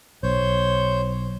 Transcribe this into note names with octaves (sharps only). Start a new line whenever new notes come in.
B1 C5 C#5 G6